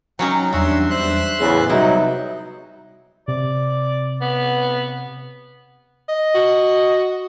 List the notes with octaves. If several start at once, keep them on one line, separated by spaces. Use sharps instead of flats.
F#3 C#4 D#4 G5 A6
E2 G3 C#4 D4 F#4 E5 C6
C5 E5 F#6
E2 A2 C#3 A6
C3 F#3 G3 B3 C4 D#4 E4
C3 D5
B3
D#5
F#4